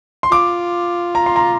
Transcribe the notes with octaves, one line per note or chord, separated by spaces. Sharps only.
C6
F4 D6
A#5
C6
A#5